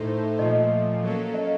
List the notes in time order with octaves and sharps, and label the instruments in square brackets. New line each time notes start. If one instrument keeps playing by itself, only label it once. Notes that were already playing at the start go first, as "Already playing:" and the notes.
Already playing: [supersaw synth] A2 A3 D#4 A4 C5
[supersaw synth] A#2 F3 A3 [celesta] D#5
[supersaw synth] F#3 A#3 C#4 A4
[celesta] D#5